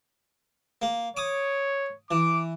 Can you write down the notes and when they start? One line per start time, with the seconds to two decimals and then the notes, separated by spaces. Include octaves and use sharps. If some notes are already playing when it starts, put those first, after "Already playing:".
0.82 A#3
1.17 C#5 D6 D#6
2.11 E3 D6